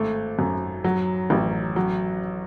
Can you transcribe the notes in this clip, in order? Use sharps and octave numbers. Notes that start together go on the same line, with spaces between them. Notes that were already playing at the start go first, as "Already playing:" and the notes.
Already playing: G#1 A3
F#2
F#3
A1
F#3